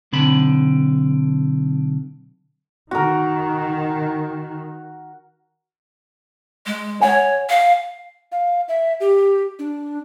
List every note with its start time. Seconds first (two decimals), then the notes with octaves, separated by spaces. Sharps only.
0.12 B1 D3 C4 A5 B5
2.91 D#3 F#4 A#4
6.66 G#3
7.01 C#5 F#5 G#5
7.49 F5
8.32 F5
8.69 E5
9.01 G4
9.59 D4